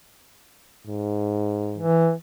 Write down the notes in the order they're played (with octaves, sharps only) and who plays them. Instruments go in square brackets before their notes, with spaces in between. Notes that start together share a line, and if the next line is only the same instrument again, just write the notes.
[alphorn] G#2
[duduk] E3